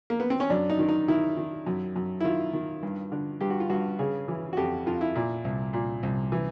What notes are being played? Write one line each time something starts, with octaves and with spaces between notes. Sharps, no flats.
A#3
B3
C4
C#4
F#2 D4
D#4
D#3
D#4
D#3 E4
D#3
F#2
F#2
E4
D#3 F4
D#3
G2
D3
G2 G4
F#4
F4
G2 F#4
C#3 G#4
E3
F#4
F2 G4
F2 F4
E4
A#2
C2
A#2
C2
E3